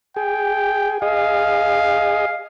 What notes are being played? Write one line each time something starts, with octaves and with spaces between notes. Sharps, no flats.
G#4 G5
G#4 D#5 F5